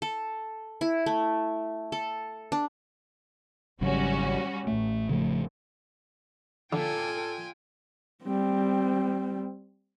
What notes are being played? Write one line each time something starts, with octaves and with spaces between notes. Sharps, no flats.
A4
E4
A3
A4
D4
G#1 C#3 F#3 G3 C#4 F#4
A1 A3
C#3 F3 A3
D3 F4 A4 D5 G5 G#5
G3 C4